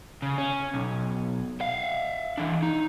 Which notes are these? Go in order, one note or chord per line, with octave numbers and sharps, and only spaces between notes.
C#3
C#4
B1
E5 F5
E3 D4
D#4